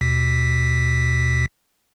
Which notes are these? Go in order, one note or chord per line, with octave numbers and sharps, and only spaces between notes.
D#2 B2 B6